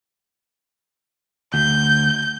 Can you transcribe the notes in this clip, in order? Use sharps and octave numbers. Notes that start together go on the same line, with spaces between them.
D2 G6